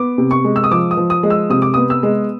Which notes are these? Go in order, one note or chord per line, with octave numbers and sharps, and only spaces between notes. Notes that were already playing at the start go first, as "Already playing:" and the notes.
Already playing: B3 D6
C3
C#6
G#3
E6
D#6
F3 D6
D#6
F3
D#6
G#3
E6
C3 D#6
D6
B3 D#6
E6
G#3